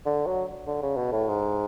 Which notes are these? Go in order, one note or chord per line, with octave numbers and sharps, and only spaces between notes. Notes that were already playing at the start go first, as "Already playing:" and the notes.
D3
F#3
D3
C#3
B2
A2
G#2